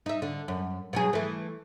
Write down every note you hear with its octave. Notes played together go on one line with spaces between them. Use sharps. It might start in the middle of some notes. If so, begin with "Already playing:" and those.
D#4 E5
D3
F#2
B2 F#3 G#4
E3 A3